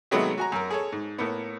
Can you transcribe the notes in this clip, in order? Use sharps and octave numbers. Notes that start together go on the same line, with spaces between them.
C3 D#3 F#3 G#3 A3 B3
F#4 G#5 A#5
F#2 A#4
G#4 A4 C#5
G#2
A2 A#3 B3